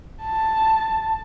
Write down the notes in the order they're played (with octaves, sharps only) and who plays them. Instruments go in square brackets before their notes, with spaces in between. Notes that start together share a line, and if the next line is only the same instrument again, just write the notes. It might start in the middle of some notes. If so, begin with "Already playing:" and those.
[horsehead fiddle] A5